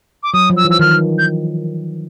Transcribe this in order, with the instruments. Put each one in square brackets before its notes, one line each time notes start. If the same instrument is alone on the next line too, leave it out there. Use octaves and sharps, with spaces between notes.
[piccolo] D6
[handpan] F#3 [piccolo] D#6
[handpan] F3
[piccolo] E6
[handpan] E3
[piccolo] E6
[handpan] D#3 [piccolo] F6
[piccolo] G6